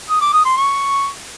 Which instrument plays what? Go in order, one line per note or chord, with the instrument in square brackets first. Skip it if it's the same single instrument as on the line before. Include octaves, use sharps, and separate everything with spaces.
[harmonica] D#6
D6
D#6
C6
C#6